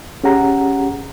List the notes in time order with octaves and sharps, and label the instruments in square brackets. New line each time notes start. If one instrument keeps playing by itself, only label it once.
[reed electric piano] C#4 G4 G#4 F#5 A#5